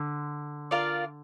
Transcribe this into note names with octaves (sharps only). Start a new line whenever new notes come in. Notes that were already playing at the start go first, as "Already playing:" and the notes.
Already playing: D3
F4 A#4 D5 F5